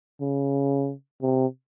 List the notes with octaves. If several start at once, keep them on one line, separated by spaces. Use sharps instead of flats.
C#3
C3